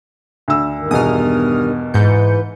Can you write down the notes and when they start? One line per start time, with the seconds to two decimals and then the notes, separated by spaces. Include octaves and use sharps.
0.48 D2 E6
0.78 G2 D#3
0.91 E2 B2 D#6 F6
1.94 G#2 E3 B4 G6 C#7